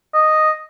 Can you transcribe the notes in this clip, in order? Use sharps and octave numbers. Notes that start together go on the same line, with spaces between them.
D#5